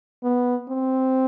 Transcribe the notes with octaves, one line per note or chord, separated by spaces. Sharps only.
B3
C4